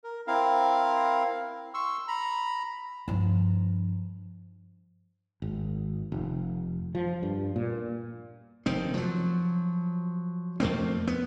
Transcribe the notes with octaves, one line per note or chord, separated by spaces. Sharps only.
A#4
C4 E4 A#4 F5
C6 C#6 E6
A#5 B5
G2 F3
G#1
F1
F3
G2
A#2
F1 D#3 C4
F3 F#3
F2 A3 A#3 C4
B3